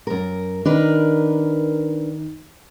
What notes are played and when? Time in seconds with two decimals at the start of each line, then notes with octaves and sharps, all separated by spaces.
0.07 F#2 A#4
0.65 D#3 D4 A#4 B4